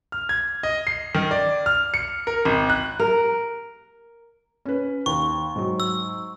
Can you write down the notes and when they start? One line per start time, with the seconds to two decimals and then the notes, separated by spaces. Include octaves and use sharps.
0.12 F6
0.29 G#6
0.63 D#5
0.87 C7
1.15 D#3
1.31 D5
1.66 F6
1.94 C#7
2.27 A#4
2.45 G#1
2.70 F#6
2.99 A#4
4.65 C#4 B4
5.06 D#2 C#6
5.56 G#2 F#3
5.80 E6